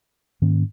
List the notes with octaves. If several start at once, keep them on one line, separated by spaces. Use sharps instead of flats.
G#2 D#3 A#3 C#4